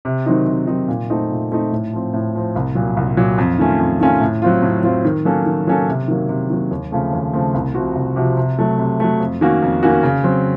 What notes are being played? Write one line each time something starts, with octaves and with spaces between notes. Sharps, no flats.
C3
D#3 F#3 C4 D#4
C3
D#3 F#3 C4 D#4
A#2
A3 C4 D#4
A#2
A3 C4 D#4
A2
F3 C4
A2
F3 C4
C2
A#2 F#3
C2
A#2 F#3
F2
D#3 A3 C#4 F4
F2
D#3 A3 C#4 F4
A2
F#3 C4 F4
A2
F#3 C4 F4
D#3
F#3 A#3 C#4 A4
D#3
F#3 A#3 C#4 A4
C3
D#3 F#3 A#3
C3
D#3 F#3 A#3
D#2
C#3 F3 A3 C4
D#2
C#3 F3 A3 C4
C2
C3 F3 C4 F#4
C2
C3 F3 C4 F#4
C3
F#3 A3
C3
F#3 A3
F2
D#3 A#3 C#4 F#4
F2
D#3 A#3 C#4 F#4
C#3
F#3 C4